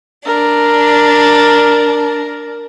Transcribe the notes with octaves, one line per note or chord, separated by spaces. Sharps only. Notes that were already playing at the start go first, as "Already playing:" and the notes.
D4 A#4